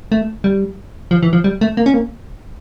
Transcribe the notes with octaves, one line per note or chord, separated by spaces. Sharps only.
A3
G3
F3
E3
F3
G3
A3
A#3
C#4
A#3